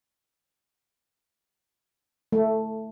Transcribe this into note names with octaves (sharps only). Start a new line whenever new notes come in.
A3